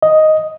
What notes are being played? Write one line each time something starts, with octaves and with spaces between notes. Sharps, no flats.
D#5